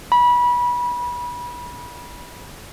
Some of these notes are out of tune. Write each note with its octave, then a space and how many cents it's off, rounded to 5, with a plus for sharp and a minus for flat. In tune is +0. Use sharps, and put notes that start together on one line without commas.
B5 -25